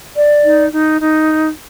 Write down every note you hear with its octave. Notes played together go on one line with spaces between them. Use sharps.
D5
D#4
D#4
D#4